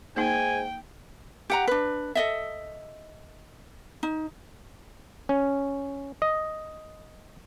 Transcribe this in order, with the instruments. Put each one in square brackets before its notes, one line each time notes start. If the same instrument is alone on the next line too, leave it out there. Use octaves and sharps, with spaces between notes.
[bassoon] G#2 [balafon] A#3 D#4 [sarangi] G5 [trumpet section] G#5
[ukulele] G4 F#5 A#5
D4 B4
A4 D#5 E5
D#4
[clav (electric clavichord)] C#4
D#5